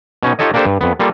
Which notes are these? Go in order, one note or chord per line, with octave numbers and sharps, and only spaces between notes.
B2 C#4 D#4
D#4 F4 G4 A4 C#5 D#5
A#3 D4 G4 A4 C5
G2
F2 B3
G3 A#3 F4 A4